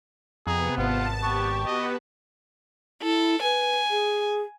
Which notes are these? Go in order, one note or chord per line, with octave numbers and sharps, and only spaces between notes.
F2 C3 B3 G#4 A#5
G#1 F4 F#5 A5
B3 G4 C#6
B3 F#4 B4 D#5
E4 A4
B4 G#5
G#4